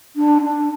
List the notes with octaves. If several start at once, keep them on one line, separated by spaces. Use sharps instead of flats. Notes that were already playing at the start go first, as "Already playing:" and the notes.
D4
D4